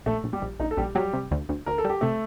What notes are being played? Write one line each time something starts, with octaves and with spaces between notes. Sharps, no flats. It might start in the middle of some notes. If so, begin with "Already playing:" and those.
A#1 A3 A4
A#1
G3 G4
A#1
A#1 D#4
A4
A#1 G3 G4
F#3 G3 G4
C3
D2
D2
D2 A#4
A4
G3
G4
C3 A3 A4